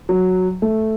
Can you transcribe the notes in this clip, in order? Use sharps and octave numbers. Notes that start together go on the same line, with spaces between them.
F#3
A3